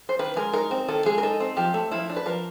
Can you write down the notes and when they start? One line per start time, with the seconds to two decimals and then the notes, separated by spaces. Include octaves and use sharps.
0.09 C5
0.19 D#3 B4
0.36 G#3 A#4
0.53 D#4 A#4
0.71 C4
0.88 D#3 A4
1.06 G#3 G#4
1.18 A#4
1.23 D#4 A4
1.40 C4
1.57 F3 G4
1.74 A3
1.91 F3 E4
2.10 D4
2.16 B4
2.26 F3 A#4